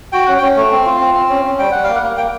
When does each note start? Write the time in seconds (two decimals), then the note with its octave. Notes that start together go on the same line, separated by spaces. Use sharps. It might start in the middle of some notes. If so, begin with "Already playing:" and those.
0.12 F#4 G5
0.26 C#4 F#5
0.38 C#4 G5
0.56 A3
0.72 C4
0.86 F4
1.00 C4
1.15 C4
1.29 C#4
1.45 C#4
1.59 G3 G5
1.72 G3 F#5
1.84 A#3 F5
1.95 F#5
2.03 A#3
2.17 A#3 G5